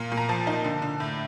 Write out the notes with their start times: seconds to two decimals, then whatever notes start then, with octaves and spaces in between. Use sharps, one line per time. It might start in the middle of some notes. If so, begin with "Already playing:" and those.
Already playing: A#2 F5
0.12 A#2
0.17 A#5
0.29 F3 A5
0.47 D#4
0.64 D3
0.82 D3
1.00 A2